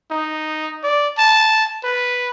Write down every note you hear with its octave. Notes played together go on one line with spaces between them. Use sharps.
D#4
D5
A5
B4